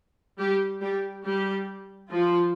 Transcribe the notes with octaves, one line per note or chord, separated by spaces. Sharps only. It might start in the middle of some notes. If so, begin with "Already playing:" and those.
G3 G4
G3 G4
G3 G4
F3 F4